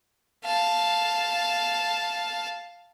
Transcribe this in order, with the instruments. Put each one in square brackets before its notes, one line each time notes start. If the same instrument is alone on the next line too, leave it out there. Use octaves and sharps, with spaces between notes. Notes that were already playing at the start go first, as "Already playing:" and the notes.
[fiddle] F5 A5